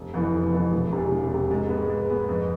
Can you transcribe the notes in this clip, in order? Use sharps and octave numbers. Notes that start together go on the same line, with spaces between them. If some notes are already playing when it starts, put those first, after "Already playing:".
Already playing: F1
F2 E3 B3
F1
F2 E3 B3
E1
E2 C3
E1
E2 C3
G#2
G#3 B3
G#2
G#3 B3
F2